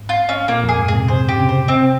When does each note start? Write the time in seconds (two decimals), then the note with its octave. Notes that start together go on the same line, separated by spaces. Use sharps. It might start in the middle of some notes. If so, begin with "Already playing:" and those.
Already playing: G#2
0.09 F4
0.29 C#4
0.48 A#2 A#3
0.64 F2
0.69 G#4
0.78 G#2
0.88 G#4
0.94 C3
1.08 C3 C5
1.28 C3 G4
1.38 C#3
1.49 C5
1.68 C3 C4